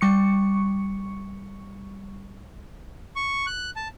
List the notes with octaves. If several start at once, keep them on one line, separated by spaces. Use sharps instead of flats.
G3 C#6 C#7
C#6
F#6
A5